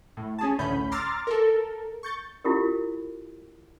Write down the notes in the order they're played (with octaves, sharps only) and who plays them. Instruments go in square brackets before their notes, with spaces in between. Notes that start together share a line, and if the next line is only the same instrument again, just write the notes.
[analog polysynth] A2
C#4 G#4 A5
A1 D2 C#4 B5 G6
A#5 C6 D6 E6 F6 A6
A4 A#4
C#6 G6 A6
[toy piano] E4 F4 G4 A4 A#4